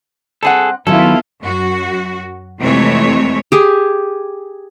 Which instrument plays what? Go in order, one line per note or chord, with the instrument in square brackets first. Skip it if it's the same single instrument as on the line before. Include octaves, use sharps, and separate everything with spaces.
[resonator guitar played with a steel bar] G3 C4 F#5 [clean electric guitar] G#4 A4
[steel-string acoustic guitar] D#3 F#3 [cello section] B3 E4 F4 [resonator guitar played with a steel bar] C#4 [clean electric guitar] A4
[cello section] F#2 F#4
F2 C3 E3 G#3 A3 C#5
[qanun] G4 G#4